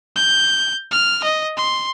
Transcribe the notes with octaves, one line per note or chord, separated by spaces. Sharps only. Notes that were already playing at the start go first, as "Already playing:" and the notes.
G6
F6
D#5
C6